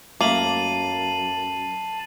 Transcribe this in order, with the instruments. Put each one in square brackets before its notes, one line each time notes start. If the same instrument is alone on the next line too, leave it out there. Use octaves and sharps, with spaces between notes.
[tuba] F#2 [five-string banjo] A3 A#3 [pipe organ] A5 [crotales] C7 D#7 F#7